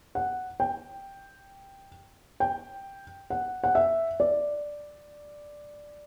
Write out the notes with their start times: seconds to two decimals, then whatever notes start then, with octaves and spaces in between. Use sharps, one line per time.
0.15 F#5
0.60 G5
2.40 G5
3.30 F#5
3.64 F#5
3.75 E5
4.20 D5